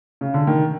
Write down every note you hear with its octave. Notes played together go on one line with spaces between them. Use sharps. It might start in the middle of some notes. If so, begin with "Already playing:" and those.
C#3
D3
D#3